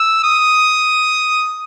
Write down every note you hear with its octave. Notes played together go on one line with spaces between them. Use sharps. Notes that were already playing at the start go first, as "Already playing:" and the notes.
Already playing: E6
D#6